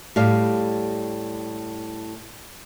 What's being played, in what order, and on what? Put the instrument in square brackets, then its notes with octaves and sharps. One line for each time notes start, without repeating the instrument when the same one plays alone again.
[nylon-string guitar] A2 G3 G4 F5